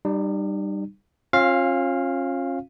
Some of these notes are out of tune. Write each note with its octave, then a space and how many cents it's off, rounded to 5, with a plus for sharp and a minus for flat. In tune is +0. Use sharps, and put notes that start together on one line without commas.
G3 +0 D#4 -40
C#4 -35 F4 +25 F5 +0